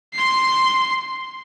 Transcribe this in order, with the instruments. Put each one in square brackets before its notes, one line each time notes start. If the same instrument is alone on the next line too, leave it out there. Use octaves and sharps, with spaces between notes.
[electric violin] C6 C7